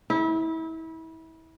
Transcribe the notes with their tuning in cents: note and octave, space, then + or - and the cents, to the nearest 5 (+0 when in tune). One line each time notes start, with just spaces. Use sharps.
E4 -30